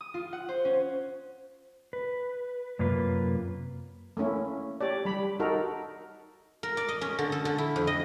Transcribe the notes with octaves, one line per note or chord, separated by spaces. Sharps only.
D#6
F4
F#5
C5
C#4
B4
F#2 C3 A#3 F4 B4
A3 A#3 C#4 E4
G4 C#5 D5
G3 B5
D#4 F#4 A4 A#4
A#4
D5
D#5
C#4
D3
A4
D3
E4
F2
D#5